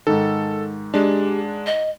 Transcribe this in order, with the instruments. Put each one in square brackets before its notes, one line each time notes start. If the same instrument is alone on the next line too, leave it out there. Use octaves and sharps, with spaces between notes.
[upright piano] G#2 D#3 [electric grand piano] A4
[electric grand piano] G#3 D4 [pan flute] G4
[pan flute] D#5